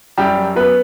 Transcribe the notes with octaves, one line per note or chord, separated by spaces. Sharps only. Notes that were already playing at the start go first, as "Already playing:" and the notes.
F#2 G3 G4
F#3
F#2 B3 B4